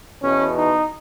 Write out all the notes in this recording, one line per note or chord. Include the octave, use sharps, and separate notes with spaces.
E2 B2 C#4
D#4